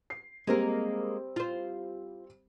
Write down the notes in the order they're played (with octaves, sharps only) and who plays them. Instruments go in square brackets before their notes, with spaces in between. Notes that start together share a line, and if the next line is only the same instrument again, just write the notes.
[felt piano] C7
[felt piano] G3 C4 G4 [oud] G#3 A#3 A#4
[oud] F4 C5